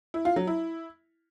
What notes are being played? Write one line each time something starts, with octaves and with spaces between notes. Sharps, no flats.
E4
F4
F#3
E4